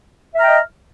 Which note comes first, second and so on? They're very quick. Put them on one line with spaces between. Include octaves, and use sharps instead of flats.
E5 F6 A#5 G5 D#5